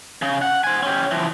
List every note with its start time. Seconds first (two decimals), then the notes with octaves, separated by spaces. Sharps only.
0.22 C#3
0.42 F#5
0.64 C5 G#5
0.83 C#4 G4
1.11 E3 F3